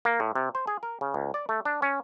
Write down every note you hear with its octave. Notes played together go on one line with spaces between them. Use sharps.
A#3
A2
C3
C5
G#4
A#4
C#3
C#2
D5
A3
D4
C#4